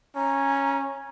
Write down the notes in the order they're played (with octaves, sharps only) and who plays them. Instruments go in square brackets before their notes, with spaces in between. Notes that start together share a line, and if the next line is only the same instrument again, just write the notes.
[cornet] C#4 [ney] A#5